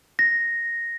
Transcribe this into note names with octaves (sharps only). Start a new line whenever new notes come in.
A#6